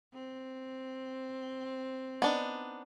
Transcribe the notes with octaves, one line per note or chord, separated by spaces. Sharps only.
C4
B3 D4 D#4